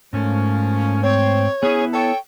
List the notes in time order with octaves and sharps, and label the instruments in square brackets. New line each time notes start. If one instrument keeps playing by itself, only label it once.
[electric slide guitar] G#2 A3 [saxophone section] F3 A#3 C#4
[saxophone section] C4 [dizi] C#5
[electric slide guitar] B3 E4 [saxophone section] C#4 G#4
[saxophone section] A4 C#5 [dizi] G5